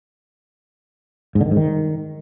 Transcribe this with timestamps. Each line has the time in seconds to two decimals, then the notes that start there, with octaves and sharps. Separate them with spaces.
1.35 G#2
1.41 D3
1.46 D#3
1.51 G#2
1.57 D#3